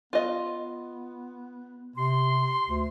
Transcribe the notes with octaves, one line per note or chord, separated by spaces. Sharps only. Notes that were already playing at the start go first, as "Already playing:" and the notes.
B3 F4 D#5
C3 C6
D2